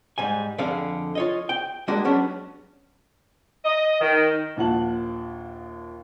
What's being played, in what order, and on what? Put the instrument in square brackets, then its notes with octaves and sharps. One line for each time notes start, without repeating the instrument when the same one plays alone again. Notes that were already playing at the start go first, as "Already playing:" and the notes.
[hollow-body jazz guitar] G#2 G3 G#5
F2 D3 G#4 D5 F5
F4 C#5 D#5
G5
G3 G#3 A#3 D4 F#4
F#3 B3 C#4 D4
[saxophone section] D#5
D#3
[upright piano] A#1 D#2 F4 F#5 A5 F#7